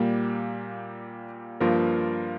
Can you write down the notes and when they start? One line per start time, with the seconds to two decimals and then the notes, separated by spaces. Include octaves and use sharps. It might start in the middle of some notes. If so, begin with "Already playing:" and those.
Already playing: A#2 G3 A#3
1.60 G2 F3 A#3 F4 A#4